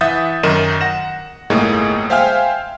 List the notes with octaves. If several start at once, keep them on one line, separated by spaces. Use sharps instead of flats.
E3 E5 F#5 D#6 G6 A6
F#2 D#3 D#4 A#4 D#7 E7
F#5 A#6 E7
G1 A2 G#3 A#3 D#4 G#4
C5 E5 F5 G5 G#5 F6